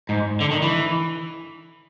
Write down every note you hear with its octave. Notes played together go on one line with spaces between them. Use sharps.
G#2
D3
D#3
E3